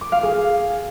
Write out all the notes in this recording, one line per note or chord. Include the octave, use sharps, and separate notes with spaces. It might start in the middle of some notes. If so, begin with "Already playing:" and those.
D6
F5
G#4